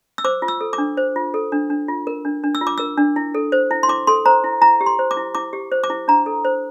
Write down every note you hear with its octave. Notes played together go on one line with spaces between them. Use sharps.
E6
C5 D6
F4
E6
A4
D6
D4
C5
F4
A4
D4
D4
F4
A#4
D4
D4
E6
F4
D6
A#4 E6
D4
E4
A4
C5
E4
C6
E4 D6
A4 C6
C5 A#5
E4
E4 A#5
G4
C6
C5
D6
E4
E4 D6
G4
C5
D6
E4
D4 A#5
A4
C5